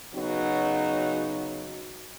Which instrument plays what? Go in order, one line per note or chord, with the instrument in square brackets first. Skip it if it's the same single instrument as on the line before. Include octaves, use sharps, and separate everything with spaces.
[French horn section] C#3 F#3 B3 D#4 F#4